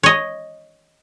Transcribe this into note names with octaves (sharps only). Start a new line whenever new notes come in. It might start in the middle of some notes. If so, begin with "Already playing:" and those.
C#5 D#5